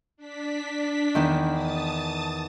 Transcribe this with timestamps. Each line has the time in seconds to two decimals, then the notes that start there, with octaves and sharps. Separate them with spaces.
0.17 D4 B6
1.15 E2 D#3
1.51 A5 D#6 A6